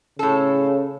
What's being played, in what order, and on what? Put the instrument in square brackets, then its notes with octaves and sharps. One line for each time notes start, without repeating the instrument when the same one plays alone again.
[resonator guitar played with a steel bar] A2 A4 [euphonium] C#3